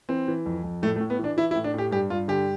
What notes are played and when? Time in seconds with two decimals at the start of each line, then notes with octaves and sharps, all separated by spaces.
0.09 E3 C4
0.28 E3
0.46 F2
0.64 F2
0.82 A2 A3
0.96 A3
1.00 A2
1.10 B3
1.19 E3
1.24 D4
1.37 E3 E4
1.51 E4
1.56 A2
1.64 D4
1.74 A2 G4
1.91 G2 G4
2.10 G2 F4
2.28 D3 G4